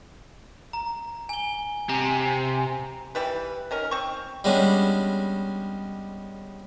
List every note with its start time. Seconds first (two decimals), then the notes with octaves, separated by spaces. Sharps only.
0.73 A#5
1.29 G#5 G7
1.89 C3 G#5 A#5
3.15 E3 G3 B4
3.71 D#3 C#4 A#4
3.91 C4 C#6
4.44 G3 G#3 B3 C#4 D4